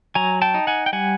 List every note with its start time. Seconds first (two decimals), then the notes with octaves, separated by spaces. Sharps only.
0.15 F#3 G#5 A#5
0.42 G5 A5
0.54 D#4
0.67 F#5 G#5
0.86 G5
0.93 G3 F#5 G#5